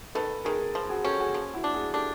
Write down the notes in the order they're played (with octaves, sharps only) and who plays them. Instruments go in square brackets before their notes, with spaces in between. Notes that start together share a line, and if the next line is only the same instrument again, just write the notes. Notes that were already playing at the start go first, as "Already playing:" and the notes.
[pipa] D#3 [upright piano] A4 B4
[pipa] D#3 [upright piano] G#4 A#4
[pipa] F3
[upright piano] F#4 G#4
[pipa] C#4 [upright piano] G4 A4
[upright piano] F#4 G#4
[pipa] F3
[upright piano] E4 F#4
[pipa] D4
[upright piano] F#4 G#4
[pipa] D4 [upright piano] G4 A4